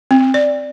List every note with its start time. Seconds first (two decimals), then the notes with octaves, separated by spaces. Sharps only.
0.11 C4
0.34 D5